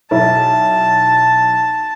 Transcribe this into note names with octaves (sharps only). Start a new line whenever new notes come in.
B1 E4 A5